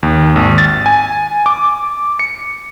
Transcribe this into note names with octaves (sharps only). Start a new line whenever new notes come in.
D#2
G#1
A6
G#5
D6
C#7